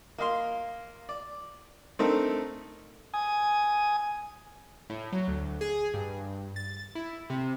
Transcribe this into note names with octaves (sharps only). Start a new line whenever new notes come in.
A#3 D#5 F5 C6
D5
A3 C4 D4 D#4 A4 A#4
G#5 D#6
A2
F#3
D2
G#4
G2
A6
E4
C3